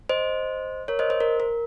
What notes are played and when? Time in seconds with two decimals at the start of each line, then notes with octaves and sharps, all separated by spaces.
0.09 C5 D#5
0.88 A#4 C#5
0.99 C5 D#5
1.10 C5
1.20 A#4
1.40 A#4